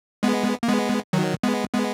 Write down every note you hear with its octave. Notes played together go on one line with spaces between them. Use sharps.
G#3 B3
A#3
G#3 B3
D#3 F#3
G#3 B3
G#3 B3